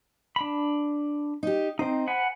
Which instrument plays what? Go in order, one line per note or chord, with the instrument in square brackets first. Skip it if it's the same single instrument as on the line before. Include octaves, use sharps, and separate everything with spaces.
[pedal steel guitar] D4 B5
[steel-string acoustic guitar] D#4 G4
[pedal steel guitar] C4 D#4 [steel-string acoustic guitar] C5
[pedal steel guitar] F#5 G#5 B5